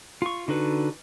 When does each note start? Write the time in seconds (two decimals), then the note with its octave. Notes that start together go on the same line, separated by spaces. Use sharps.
0.22 F4 C#6
0.48 D3 D#4 F#4 B4